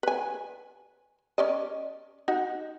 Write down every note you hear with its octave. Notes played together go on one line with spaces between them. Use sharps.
B4 G#5
C#4 D5 D#5
D#4 F#4 F#5